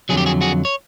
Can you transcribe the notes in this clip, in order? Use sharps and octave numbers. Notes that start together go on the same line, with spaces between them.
F2 D3 F#3 G#4
G4
F#4 G#4
F#4 G#4
C#5